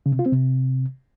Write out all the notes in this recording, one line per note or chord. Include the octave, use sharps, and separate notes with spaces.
C#3
C3
F4
C4
C3